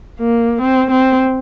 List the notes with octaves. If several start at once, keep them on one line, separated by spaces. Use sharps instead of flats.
A#3
C4
C4